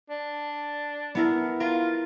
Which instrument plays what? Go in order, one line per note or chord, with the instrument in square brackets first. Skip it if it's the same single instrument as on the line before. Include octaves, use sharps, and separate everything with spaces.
[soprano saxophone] D4
[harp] B3 E4 A#4
[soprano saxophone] F4 [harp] A#4